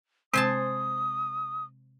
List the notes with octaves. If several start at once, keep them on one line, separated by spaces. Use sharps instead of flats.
C3 G#3 C4 C5 G#5 A5 D#6